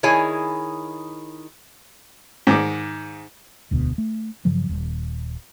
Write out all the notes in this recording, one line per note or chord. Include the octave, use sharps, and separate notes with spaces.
D#3 E4 G#4 C#5 G#5
G#2 D#3 D6
E1 D2 B2
A3
G2 C#3 F3 F#3
D#1